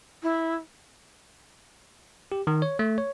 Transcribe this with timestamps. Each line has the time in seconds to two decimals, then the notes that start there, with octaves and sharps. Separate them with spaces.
0.23 E4
2.32 G4
2.47 D#3
2.62 C#5
2.79 A3
2.98 C#5